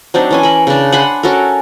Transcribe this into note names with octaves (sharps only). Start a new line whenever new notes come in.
F#3 C4 D4 D#4
E3 C#4 G#5
A#4 B5
C#3 D4
F#5 G#5 B5 C6
C#4 F#4 A4 A#4